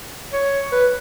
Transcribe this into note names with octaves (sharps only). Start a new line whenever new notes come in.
C#5
B4